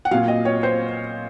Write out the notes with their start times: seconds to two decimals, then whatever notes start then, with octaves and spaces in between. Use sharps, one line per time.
0.05 F#5
0.11 A#2 F#3 F5
0.28 D#5
0.45 C#5
0.63 C5